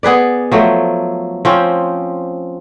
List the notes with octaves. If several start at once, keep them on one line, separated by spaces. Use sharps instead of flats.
B3 G#4 B4 D5
F3 F#3 A3
F3 C4 C#4